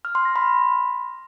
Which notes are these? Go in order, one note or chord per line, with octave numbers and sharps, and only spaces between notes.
F6
C6
A#6
B5